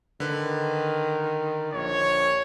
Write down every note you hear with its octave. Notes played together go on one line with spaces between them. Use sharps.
D3 D#3 B4
A#1 C#5